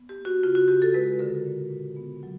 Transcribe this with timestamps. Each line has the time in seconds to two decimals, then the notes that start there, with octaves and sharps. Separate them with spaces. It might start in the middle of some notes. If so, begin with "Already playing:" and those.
Already playing: B3
0.09 G4
0.18 A#3
0.25 F#4
0.43 C#3 F4
0.55 F#4
0.68 C#3 G4
0.82 A4
0.94 G#3 B4
1.19 D3 A#4
1.46 A#2
1.70 A#2
1.96 B3
2.23 F#3